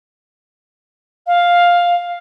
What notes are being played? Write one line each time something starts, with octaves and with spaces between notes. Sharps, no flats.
F5